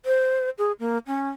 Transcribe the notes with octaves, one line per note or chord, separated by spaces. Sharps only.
C5
G#4
A#3
C#4